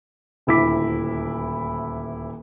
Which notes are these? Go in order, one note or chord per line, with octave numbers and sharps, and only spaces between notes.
D#1 D2 E4 D6 B6